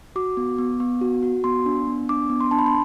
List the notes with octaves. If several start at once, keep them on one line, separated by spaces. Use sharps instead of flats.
F#4 D6
B3
B3
B3
F#4
F#4
B3 C6
D4
B3
D4 D6
B3
C6
D4 A5
B5
C6